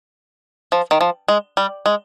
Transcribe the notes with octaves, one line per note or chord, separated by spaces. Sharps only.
F3
D#3
F3
G#3
G3
G#3